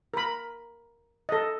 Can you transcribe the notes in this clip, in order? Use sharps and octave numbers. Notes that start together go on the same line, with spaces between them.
A#4 B5
A4 D#5